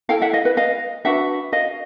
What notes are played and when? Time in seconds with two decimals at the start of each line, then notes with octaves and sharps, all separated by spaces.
0.09 E4 A4 F5 G5
0.22 E5 F#5
0.33 D#5 F5
0.45 B4
0.57 D#5 F5
1.05 D4 F#4 B4 E5 F#5
1.53 D#5 F5